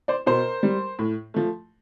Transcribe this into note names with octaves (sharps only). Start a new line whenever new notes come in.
C5 D5
B2 A#4 C5
G3
A2
F3 A3